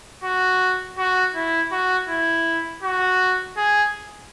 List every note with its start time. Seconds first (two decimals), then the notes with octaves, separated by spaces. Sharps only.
0.24 F#4
0.98 F#4
1.35 E4
1.72 F#4
2.09 E4
2.83 F#4
3.57 G#4